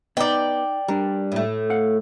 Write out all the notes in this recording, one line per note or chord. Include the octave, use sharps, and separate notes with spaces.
B3 D#4 D5 G5
G3 D4 A#4
A2 A3
F5 F#5